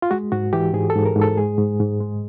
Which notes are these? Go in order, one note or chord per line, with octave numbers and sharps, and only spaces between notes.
F4
G#3 F#4
G#2 F#4
E3 G4
G#2 G#4
A4
G#2
A#4
G#2
A4
G#3 G#4
G#2
G#2
G#3